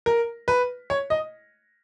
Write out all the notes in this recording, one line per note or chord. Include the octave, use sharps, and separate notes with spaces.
A#4
B4
C#5
D#5